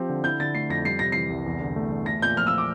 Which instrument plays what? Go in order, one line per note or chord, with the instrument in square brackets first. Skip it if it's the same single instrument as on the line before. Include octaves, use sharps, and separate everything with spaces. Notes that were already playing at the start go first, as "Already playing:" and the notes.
Already playing: [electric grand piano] F3 C4 G4
D3
[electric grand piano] E4 [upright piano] G6
[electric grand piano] D3 [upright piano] A6
[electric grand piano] A3 [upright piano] C7
[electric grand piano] F2 [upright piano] A#6
[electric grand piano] G3 [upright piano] C7
[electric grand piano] C3 [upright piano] A#6
[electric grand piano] E3 [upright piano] C7
[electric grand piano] C2
E2
D3
A3
E2
[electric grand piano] A3 [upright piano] A#6
[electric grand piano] A#2 [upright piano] G6
[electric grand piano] F3 [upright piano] F6
[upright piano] E6
D6